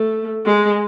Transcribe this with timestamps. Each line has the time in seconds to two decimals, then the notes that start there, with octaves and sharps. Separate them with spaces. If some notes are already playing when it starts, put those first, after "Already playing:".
Already playing: A3
0.46 G#3